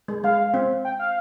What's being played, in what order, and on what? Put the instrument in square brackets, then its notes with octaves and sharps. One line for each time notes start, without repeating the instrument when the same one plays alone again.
[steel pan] G#3
[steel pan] G#3 [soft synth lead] F5
[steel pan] C4
[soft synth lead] G5
F5